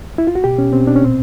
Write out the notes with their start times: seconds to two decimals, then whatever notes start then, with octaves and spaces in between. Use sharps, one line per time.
0.18 E4
0.27 F4
0.35 F#4
0.44 B2 G4
0.58 B2 C#4
0.73 B2 C4
0.87 B2 D4
0.96 C#4
1.03 A#2 C4